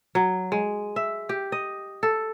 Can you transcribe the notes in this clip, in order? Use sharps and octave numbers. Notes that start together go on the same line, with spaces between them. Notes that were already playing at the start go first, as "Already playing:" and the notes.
F#3
G#3
E5
G4
D#5
A4